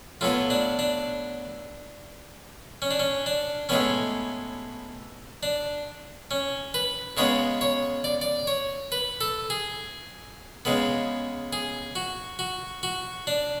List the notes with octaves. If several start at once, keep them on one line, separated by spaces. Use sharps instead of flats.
A2 F#3 B3 F4
D4
D4
C#4
D4
C#4
D4
A2 G#3 B3 C#4
D4
C#4
B4
C#3 G#3 B3 C#5
C#5
D5
D5
C#5
B4
A4
G#4
C#3 G#3 B3
G#4
F#4
F#4
F#4
D4